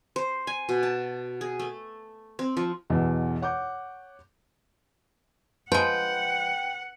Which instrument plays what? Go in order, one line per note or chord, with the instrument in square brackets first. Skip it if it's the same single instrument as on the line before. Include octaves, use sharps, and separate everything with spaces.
[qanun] C5
G#5
B2
A5
G#4
A3
C4
F3
[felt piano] B1 E2 B2 E3
C#5 F#5 D6 G6
[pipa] F3 G#3 [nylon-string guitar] B4 [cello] F#5 [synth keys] G5